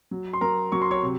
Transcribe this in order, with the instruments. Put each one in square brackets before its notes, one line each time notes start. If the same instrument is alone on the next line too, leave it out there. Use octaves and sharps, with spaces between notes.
[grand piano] F#3
C6
F#3 A#4 A#5
F#3 C#6
C6
C#5 C#6
C3